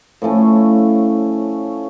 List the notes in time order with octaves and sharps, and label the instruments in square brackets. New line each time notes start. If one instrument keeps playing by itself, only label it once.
[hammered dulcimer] A2 F3 A3 C#4